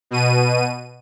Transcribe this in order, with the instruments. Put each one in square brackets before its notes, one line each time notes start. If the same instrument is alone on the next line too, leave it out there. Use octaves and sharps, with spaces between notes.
[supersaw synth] B2 D#7